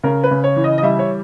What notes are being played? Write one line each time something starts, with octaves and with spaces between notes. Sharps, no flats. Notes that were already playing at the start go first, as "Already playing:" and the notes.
C#3 A#4
B4
C#3
C#5
E3
D#5
D#5
G3 E5
C#5